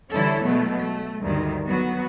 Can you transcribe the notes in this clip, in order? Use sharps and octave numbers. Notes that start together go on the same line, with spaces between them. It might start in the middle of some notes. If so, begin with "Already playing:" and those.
D3 E3 G3 E4 A4 C#5
B2 F#3 G#3 A3 B3
A3
D2 G2 D#3
F#3 B3 F#4